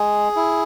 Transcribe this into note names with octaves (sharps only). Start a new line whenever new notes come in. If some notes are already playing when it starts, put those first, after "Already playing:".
Already playing: G#3 G#4
E4